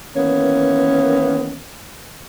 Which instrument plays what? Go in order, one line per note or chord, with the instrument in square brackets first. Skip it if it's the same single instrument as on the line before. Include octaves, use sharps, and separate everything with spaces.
[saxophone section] D#3 E3 A#3 B3 C#4